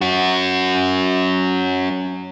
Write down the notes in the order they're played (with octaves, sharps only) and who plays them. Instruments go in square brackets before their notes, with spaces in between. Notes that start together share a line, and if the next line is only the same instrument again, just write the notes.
[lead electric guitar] C#4 F#4